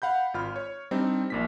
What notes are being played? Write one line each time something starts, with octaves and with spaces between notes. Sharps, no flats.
F5 F#5 B5 G6
G#1 F4 B5 F6
C#5
G3 C4 D4 D#4
A#1 A#2 B6